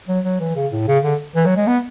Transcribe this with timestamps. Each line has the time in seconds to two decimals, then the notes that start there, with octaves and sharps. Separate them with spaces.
0.08 F#3
0.25 F#3
0.40 E3
0.56 C#3
0.72 A2
0.88 C#3
1.04 D3
1.36 E3
1.46 F#3
1.57 G#3
1.67 B3